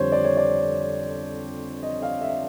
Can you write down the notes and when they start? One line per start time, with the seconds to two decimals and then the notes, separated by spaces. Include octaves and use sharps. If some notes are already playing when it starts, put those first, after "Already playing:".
Already playing: F2 D3 G3 C5 C#5
0.12 D5
0.24 C#5
0.37 D5
1.83 D#5
2.02 F5
2.22 E5